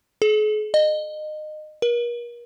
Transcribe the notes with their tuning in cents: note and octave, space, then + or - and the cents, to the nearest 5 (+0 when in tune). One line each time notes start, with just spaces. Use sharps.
G#4 +45
D#5 -25
A#4 +40